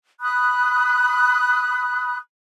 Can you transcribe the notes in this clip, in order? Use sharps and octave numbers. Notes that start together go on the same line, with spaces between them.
B5 D#6 F#6